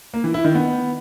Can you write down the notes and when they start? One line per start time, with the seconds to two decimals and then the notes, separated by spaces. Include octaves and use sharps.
0.14 A#3
0.24 E3
0.34 E4
0.45 D#3
0.55 B3